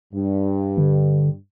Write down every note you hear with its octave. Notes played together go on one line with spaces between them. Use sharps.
G2
D3